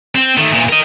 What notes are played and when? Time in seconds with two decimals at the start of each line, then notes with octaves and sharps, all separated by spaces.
0.15 C4
0.36 D#3 A3
0.51 E2 A#2
0.69 A#4 D#5